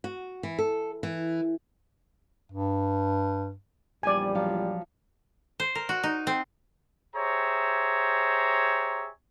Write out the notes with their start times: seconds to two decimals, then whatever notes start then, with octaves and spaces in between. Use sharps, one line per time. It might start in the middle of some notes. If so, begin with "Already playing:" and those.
0.04 F#4
0.43 E3
0.59 A4
1.03 E3
2.52 G2
4.03 A#1 E2 G3 D5 G#5
4.35 F3 F#3 F4
5.60 C5
5.75 A#4
5.89 F#4
6.04 D#4
6.27 C4
7.15 G4 G#4 C5 C#5 E5 A#5